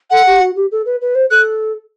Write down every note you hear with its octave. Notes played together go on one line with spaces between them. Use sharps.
A4 F#5
G4
F#4
G4
A4
B4
B4
C5
A4 F#6